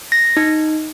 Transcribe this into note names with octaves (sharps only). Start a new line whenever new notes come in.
A#6
D#4